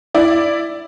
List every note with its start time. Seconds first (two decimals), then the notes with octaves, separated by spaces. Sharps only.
0.14 E4 D5